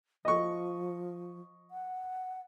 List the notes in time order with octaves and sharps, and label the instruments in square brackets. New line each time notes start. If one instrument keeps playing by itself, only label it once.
[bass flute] F3 [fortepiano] D#5 C#6
[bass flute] F#5